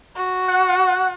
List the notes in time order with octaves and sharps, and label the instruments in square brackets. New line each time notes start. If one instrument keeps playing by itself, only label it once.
[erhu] F#4
[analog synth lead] F#5